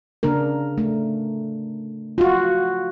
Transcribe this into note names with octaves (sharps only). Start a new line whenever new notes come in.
C#3 A#3 D4 A#4
A3
F4 F#4